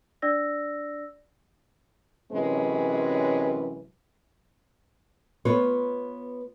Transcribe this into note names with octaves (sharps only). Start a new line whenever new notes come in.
D4 D5 E6 A#6
F#2 C3 E3 G#3 C#4 B4
B3 F4 B4 C#5